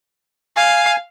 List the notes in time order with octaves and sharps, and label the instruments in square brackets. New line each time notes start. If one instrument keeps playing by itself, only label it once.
[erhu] F5 [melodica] G#5